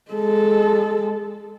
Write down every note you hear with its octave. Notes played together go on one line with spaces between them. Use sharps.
G#3 A4